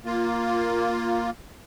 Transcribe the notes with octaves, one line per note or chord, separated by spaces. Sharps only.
A#3 F4